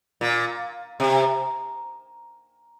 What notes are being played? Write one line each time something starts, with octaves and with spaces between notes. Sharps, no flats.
A#2
C3